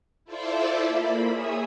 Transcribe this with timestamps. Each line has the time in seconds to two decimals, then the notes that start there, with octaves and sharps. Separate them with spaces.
0.25 E4 F4 A4 C5 D5 E5
0.87 A#3 B5
1.31 G#4 C#5 E5 G#5 D#6 E6